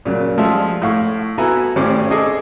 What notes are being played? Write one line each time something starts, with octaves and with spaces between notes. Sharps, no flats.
A#2 C#3 F#3
F3 G3 G#3 F4 E5
A2 F5 C#6
B3 E4 F#4 A4 G#5 A#5
G#1 A2 C#4 G4 C5 D5
G#4 A4 D#5 D6